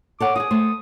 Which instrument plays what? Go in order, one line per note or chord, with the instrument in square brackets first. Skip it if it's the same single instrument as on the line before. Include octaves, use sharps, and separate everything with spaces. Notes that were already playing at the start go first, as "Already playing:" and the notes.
[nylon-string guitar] A4 C#5 F#5 [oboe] D6
[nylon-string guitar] F4 G#4 [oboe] D#6
[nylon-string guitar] A3 C5